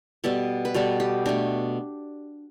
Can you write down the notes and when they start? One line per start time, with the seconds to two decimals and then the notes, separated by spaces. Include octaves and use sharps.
0.24 B2 G3 B3 A4
0.65 B4
0.74 B2 G3 B3 A4
1.00 G4
1.26 B2 A3 D4